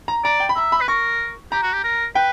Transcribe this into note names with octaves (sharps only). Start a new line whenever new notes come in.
A#5
D5 A#5
G5
B5
E5 A#5
B5
B4
A#4 C#6
G4 A#5
F#4
G4
A#4
B4 G5